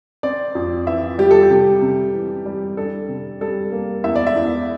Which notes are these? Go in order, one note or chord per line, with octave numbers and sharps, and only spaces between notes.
C4 D5
F2
E3 E5
G3 G4
A4
G4
C3
C3
E3
G3
D4 A4
C3
G3 A4
A#3
E2 E5
D5
E5
E2